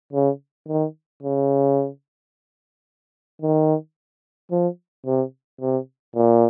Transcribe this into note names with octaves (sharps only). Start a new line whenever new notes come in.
C#3
D#3
C#3
D#3
F3
C3
C3
A#2